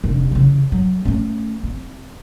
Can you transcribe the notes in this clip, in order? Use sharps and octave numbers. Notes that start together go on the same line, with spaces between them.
F1 D3
C#3 E3
F#3
A3 C#4
C4